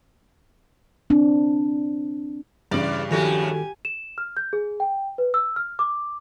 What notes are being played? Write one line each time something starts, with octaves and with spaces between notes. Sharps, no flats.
C4 D4
E2 G2 C#3 D5
A2 D#3 F3 A3 F#4 G4 A4 G#5
E7
F6
G6
G#4
G5
B4
E6
F6
D6